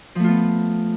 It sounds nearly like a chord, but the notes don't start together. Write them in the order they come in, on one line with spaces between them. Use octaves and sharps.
F3 A3 F4 B3